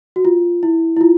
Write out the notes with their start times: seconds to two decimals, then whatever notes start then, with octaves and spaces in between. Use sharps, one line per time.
0.16 F#4
0.25 F4
0.63 E4
0.96 E4
1.01 F4